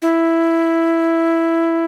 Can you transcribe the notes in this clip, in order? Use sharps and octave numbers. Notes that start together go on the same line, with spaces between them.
E4